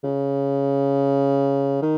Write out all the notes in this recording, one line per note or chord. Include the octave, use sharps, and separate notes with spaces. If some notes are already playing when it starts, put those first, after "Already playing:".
C#3
D#3